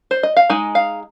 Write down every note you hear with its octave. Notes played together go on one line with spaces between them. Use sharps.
C5
D#5
F5
G#3 D#4 G#5
F5